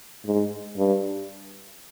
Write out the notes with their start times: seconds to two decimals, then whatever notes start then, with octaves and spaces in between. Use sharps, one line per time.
0.26 G#2
0.77 G2